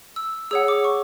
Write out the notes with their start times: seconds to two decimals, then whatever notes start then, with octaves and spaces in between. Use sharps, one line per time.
0.16 E6
0.51 G#4 C#5 F#5 E6
0.68 D6
0.84 C#6